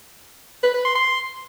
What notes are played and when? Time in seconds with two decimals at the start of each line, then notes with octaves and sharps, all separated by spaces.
0.63 B4
0.74 B4
0.85 C6
0.95 C6